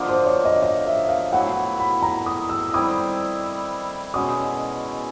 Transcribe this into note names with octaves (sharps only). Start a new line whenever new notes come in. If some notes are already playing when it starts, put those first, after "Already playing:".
Already playing: D3 F3 A#3 D#4
C5
C#5
D#5
D#5
E5
F5
A2 F#3 B3 E4 F#5
B5
A#5
D#6
E6
D#3 G3 C4 E4 D#6
B2 G#3 C#4 D#6